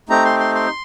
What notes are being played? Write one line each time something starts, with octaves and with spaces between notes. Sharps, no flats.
A3 C4 D#4 G4 A#5
C6
C6
C6